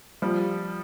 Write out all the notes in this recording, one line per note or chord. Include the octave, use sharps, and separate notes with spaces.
F3 G3